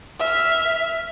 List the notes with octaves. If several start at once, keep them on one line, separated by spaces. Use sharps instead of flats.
E5 F6